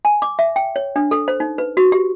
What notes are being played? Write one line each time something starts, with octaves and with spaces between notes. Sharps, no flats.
G#5
D6
E5
G5
C#5
D4
A4
C5
D#4
B4
F#4
G4